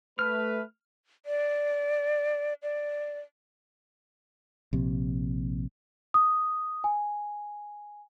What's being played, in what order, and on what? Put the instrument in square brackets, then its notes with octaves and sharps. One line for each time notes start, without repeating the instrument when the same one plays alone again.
[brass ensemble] A3 B4 [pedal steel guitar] F6
[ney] D5
D5
[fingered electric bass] A#1 C3
[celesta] D#6
G#5